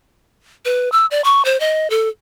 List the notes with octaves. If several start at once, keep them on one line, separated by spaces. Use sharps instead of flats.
B4
E6
D5
C#6
C5
D#5
A4